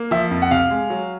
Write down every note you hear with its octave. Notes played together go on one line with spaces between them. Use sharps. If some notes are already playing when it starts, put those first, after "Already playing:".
Already playing: A#3
F3 E5
F2
F#5
C3 F5
G#3
F#3